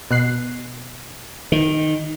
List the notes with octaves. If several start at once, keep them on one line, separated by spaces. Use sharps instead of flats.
B2 F#6 C7
D#3